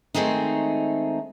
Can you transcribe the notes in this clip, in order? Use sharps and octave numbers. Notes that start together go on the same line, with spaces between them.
D#3 G#3 A3 C4 D#4